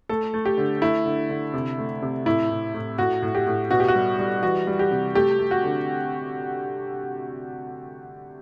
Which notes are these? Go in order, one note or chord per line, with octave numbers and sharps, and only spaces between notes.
A3 A4
A3
G4
D3
A3 E4
D3
D3
C3
A3
C3
A2 E4
A2
A2
A2 F#4
A2
G4
A2
B2 F#4
G4
F#4
G3
G3
E3 F#4
G3
G4
C3
A3 G4
A3
F#4
D3